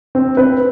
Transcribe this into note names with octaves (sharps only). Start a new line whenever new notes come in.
C4
C4 B4